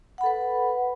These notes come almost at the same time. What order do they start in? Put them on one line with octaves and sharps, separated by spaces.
F#5 B5 A4 B4